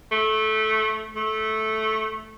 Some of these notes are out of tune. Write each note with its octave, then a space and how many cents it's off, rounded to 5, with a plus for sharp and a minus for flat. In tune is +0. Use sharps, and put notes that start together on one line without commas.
A3 -15
A3 -10